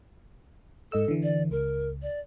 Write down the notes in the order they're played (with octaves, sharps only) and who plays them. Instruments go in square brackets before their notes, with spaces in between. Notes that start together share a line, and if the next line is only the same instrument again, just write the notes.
[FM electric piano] G#2 D#5 E6 [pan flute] A4
[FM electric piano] D3 E3
[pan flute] D5
[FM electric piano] C#2 [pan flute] A#4
[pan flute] D5